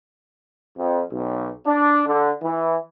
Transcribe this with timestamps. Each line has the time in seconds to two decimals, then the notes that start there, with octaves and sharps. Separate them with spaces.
0.78 F2
1.12 B1
1.67 D4
2.07 D3
2.43 E3